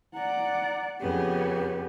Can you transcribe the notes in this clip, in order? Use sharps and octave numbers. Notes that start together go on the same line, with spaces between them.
D5 F#5 A#5
F2 C#3 B3 C#4 G4 C#5